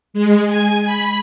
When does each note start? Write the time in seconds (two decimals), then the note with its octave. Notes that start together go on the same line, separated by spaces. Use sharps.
0.14 G#3
0.47 G#5
0.86 B5